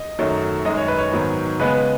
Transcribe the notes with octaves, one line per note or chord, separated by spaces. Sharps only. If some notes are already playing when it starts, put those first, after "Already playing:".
Already playing: D#5
F#2 D#3 F#3 A3
F#2 D#3 G#3 D#5
C#5
B4
C#5
G#2 D#3 F#3 B3
C#3 G#3 B3 B4
B4